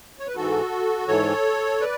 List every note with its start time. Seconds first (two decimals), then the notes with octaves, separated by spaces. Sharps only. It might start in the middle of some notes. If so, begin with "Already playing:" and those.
0.19 C#5
0.28 B4
0.35 G#2 E3 F#4 A4
1.08 G#2 E3 A4 C#5
1.81 B4 D5